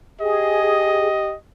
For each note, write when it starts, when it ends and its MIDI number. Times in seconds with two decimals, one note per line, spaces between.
0.21 1.33 67
0.21 1.08 68
0.21 1.35 75